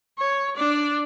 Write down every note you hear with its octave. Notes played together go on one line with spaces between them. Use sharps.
C#5
D4 D5